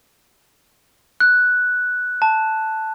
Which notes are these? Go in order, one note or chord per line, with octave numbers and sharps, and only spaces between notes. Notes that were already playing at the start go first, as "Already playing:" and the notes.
F#6
A5